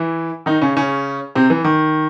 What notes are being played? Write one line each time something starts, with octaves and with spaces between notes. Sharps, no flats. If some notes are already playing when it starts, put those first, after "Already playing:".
Already playing: E3 E4
D#3 D#4
C#3 C#4
C#3 C#4
C3 C4
E3
D#3